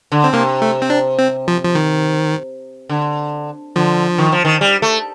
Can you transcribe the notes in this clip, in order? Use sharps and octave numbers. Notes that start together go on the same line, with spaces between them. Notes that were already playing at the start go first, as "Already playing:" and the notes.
D3
C4
C3 A#3
A3
C4
D4
C4
F3
F3
D#3
D3
D3 F3
D#3
F3
D#3
G3
A3